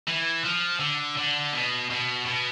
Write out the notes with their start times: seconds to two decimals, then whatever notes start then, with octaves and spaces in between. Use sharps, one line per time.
0.07 E3
0.44 F3
0.80 D3
1.17 D3
1.53 B2
1.90 B2
2.26 B2